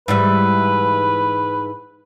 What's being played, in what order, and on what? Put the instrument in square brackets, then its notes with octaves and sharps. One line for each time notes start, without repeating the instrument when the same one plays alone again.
[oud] G#2 E3 G3 [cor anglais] B4